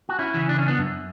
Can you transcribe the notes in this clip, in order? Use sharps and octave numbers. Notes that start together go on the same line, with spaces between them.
F#4
C#4 E4
C#3 E3
D4
C#4
B3 D4
F#2